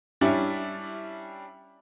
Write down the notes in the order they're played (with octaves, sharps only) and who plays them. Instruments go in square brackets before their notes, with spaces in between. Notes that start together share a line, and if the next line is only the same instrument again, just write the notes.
[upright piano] G3 C#4 D4 E4